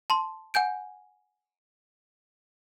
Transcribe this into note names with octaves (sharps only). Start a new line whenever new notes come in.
A5 C6
F#5 G#5 G6 D7